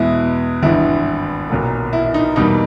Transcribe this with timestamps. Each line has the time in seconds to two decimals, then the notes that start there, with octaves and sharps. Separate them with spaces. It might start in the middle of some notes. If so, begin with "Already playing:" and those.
Already playing: E2 B2 G#3 B3 E4
0.62 G#1 G2 E3 E4
1.50 B1 A#2 F#3 A#3
1.93 E4
2.14 D#4
2.36 E2 B2 G3 A#3 D#4